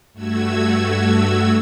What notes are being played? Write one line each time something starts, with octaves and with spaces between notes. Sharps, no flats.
G2 A3 F#4 E6 G#6